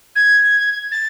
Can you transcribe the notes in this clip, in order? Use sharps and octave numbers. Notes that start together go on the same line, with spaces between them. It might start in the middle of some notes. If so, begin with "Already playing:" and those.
G#6
A6